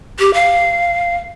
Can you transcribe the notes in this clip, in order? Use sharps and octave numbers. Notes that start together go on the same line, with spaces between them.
G4
F5